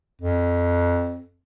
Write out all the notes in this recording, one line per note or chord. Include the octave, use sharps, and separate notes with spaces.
F2